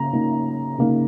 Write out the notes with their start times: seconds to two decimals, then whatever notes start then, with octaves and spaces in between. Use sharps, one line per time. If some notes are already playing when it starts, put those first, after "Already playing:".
Already playing: C#3 A#3 A#5
0.13 C#3 A#3 D#4
0.78 C#3 A#3 D#4